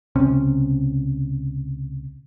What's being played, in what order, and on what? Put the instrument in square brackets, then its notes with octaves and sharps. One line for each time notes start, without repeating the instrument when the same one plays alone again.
[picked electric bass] C#2 C3 C#4